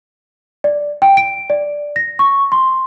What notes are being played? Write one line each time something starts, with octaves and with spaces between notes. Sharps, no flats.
D5
G5
D7
D5
A#6
C#6
C6